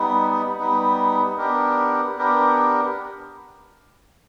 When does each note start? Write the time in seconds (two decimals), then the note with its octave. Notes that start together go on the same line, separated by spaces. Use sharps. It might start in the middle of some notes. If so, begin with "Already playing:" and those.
Already playing: G3 B3 D#4
0.58 G3 B3 D#4
1.38 B3 D4 G4 A#4
2.17 B3 D4 G4 A#4